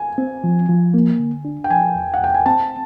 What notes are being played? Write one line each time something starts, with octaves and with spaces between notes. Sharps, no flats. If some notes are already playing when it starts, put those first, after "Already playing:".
Already playing: G#5
C4
F3
F3
A#3
D3
D4
G5
F3 G#5
E2
F#5
E2 G5
G#5
C4 A5